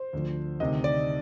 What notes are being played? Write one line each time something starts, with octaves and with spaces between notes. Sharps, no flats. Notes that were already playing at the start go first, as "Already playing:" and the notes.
Already playing: C5
D2 D3 F3
D2 C3 D#3 D#5
D5